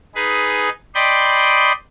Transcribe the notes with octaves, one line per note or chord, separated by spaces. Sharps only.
D#4 G#4 B4
D5 D#5 G5 B5 C6